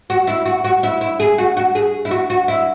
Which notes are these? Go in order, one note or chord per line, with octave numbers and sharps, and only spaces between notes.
F#4
E4
F#4
F#4
E4
E4
G#4
F#4
F#4
G#4
E4
F#4
F#4
E4